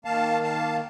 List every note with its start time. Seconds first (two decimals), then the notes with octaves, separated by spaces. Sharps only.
0.05 D#3 A#3 F5 A5
0.43 F5 A5